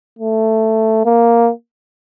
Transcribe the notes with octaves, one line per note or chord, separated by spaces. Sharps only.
A3
A#3